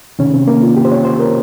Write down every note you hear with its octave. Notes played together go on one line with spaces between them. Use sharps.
C3 D#3 C#4
C4
A#3
F4
G4
C5
C#5
C5
A#4